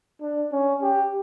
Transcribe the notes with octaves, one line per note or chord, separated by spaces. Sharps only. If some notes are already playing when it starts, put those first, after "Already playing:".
D4
C#4
G4